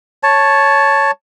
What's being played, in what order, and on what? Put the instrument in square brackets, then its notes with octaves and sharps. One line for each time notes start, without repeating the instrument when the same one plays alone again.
[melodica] C#5 A5